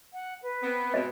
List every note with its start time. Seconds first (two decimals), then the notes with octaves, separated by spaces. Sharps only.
0.13 F#5
0.42 B4
0.62 B3 C4
0.94 B2 G#3 C4 D#5